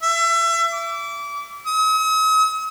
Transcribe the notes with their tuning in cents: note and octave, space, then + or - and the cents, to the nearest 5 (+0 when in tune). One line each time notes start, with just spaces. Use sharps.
E5 +30
D6 -30
D#6 +45